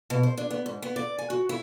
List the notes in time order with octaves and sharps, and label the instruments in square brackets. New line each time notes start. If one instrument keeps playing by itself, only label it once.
[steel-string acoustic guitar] B2
C5
D4
B3
G#2
B3
D5
G#5
F#4
E4